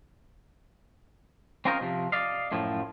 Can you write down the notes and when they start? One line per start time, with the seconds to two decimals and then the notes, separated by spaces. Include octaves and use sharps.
1.65 C4 C#4 F4 A#4 C5 D#5
1.81 C3 F3
2.12 D5 D#5 F5
2.52 F#2 A2 F3